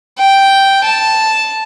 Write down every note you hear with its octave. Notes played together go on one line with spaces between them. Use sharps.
G5
A5